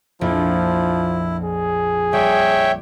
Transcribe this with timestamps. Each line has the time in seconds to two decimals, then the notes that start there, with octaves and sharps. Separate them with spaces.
0.21 A#1 F2 F3 A#3 E4
1.44 G#4
2.13 G3 G4 C#5 E5 G5